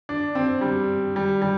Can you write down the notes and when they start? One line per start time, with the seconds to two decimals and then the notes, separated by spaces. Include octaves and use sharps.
0.09 D4
0.35 C4
0.61 G3
1.16 G3
1.42 G3